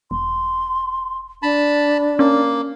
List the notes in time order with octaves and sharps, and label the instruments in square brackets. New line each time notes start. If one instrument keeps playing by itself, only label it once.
[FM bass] E1 [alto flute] C6
[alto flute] D4 [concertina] A5 B5
[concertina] A#3 [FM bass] C#4